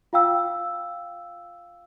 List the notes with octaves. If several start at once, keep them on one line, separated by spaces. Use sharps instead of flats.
F4 F5 G5 E6